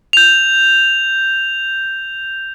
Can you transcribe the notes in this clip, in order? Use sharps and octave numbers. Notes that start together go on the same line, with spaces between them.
G6 F7